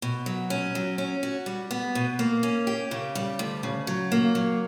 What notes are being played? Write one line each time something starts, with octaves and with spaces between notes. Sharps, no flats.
B2
F#3
C#4
F#3
C#4
F#4
G3
B3
B2
A#3
C#4
G4
C#3
G3
D2
C#3
F#3
A#3
F#3